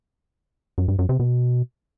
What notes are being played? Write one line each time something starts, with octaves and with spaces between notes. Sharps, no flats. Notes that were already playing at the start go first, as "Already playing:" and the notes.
F#2
G2
F#2
C3
B2